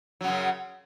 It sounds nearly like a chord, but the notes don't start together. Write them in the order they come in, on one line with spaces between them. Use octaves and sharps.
F#3 C#3 F#2